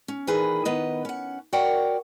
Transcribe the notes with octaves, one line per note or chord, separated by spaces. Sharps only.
C#4
D#2 A#2 E3 A#3 G#4 B4
D#3 B3 B4 D#5
C#4 F#5
F#4 A#4 C#5 D5 F#5 G5